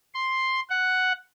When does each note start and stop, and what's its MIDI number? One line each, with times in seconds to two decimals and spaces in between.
0.15 0.60 84
0.70 1.12 78